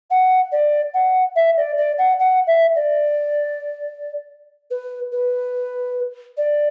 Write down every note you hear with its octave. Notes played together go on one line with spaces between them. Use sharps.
F#5
D5
F#5
E5
D5
D5
F#5
F#5
E5
D5
B4
B4
D5